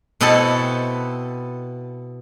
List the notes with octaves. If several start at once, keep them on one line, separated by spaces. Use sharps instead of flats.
B2 B3 C4 E4 A4 A5